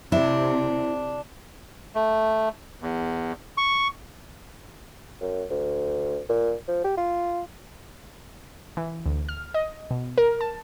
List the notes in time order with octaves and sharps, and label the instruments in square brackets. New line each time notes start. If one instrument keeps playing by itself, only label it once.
[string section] C3 [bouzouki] D4 [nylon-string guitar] E4
[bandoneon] A3
E2
C#6
[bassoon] F#2
D2
A#2
F3
G4
F4
[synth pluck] E3
D2
F6
D#5
B2
A#4
A5